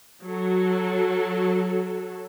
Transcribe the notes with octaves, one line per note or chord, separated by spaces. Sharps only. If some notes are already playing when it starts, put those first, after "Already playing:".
F#3 A4